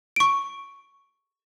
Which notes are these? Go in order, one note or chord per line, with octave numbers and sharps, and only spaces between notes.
C#6 D7